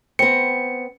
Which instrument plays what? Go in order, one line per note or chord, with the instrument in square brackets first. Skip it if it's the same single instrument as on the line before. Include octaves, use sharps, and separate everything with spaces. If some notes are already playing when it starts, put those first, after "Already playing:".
[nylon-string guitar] B3 C4 [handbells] C#7